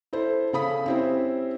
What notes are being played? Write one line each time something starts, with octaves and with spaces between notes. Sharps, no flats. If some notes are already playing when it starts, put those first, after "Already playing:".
E4 A4 C5
C#3 A4 B5 D#6 B6
C4 C#4 E4 G4 C5